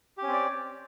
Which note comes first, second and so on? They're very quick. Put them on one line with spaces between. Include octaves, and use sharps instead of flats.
G4 C#4 C4 D5